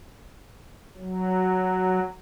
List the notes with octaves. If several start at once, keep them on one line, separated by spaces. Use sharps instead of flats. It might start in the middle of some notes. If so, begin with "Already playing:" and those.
F#3